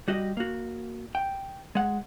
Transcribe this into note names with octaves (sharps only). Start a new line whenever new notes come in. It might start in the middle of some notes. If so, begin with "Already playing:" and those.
G3 F#4 G4 D#5
A#3 F#4
G5
G#3 F#5